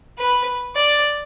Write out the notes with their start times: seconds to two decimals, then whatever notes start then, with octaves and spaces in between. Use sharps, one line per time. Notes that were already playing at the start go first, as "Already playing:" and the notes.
0.18 B4
0.76 D5